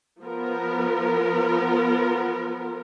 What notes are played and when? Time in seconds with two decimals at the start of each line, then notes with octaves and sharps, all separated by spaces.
0.22 F3 B3 A#4